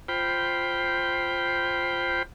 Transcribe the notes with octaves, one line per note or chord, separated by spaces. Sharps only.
F4 C5 G5 B5